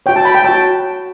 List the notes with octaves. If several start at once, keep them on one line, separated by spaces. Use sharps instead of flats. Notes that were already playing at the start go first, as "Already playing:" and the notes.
F#4 C#5 G5
A5
B5
G5
F#4 C#5 A5